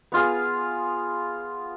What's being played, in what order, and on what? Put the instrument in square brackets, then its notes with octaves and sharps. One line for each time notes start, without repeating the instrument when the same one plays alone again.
[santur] B3 F4 G#4